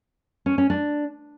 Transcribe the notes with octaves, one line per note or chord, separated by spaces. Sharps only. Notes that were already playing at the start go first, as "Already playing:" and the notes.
C#4
C#4
D4